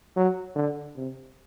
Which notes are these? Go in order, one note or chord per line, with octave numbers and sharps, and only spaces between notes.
F#3
D3
C3